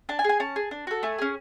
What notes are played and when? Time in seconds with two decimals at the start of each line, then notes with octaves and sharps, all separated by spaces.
0.09 D4 A5
0.19 G#5
0.24 G#4
0.29 G#5
0.40 C#4 A5
0.56 G#4
0.71 D4
0.87 F#4 A4
1.03 A3 G#5
1.18 C#4 G#4